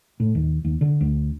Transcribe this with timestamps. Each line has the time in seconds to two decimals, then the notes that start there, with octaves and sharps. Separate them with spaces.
0.20 A2
0.35 D#2
0.65 D#2
0.81 D3
1.01 D2